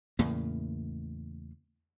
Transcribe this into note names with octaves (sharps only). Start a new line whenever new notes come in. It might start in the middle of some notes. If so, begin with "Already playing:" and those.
E2 A2 C#3 A#3